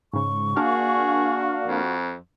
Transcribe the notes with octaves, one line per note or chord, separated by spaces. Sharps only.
G#2 C#3 C#6
A#3 D4 F#4 G#4 F5
F2